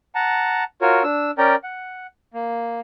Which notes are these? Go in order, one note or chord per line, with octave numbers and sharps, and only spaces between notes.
F#5 A5 A#5
F4 F#4 A#4 C#5
D4 E6
C#4 A#4 D5 G5 A#5
F#5
A#3